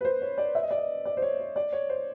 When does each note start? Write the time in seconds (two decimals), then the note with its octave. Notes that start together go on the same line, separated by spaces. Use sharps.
0.01 B4
0.05 C5
0.22 C#5
0.38 D5
0.55 E5
0.63 D#5
0.71 D5
0.78 D#5
1.06 D5
1.17 C5
1.22 C#5
1.40 C#5
1.56 D5
1.73 C#5
1.89 C5